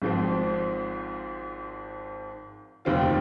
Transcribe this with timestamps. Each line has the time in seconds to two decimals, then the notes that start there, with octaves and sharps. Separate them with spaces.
0.02 G#1 G#2 F3 C4
2.85 F1 D#2 D#3 C4 F4